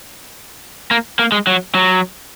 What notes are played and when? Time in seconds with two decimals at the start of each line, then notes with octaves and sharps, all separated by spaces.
0.91 A#3
1.19 A#3
1.32 G#3
1.47 F#3
1.75 F#3